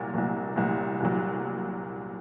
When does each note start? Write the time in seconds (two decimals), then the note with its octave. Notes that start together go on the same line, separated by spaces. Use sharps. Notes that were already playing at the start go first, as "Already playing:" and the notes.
Already playing: C2 A#2 F#3
0.14 C2 A#2 F#3
0.56 C2 A#2 F#3
1.00 C2 A#2 F#3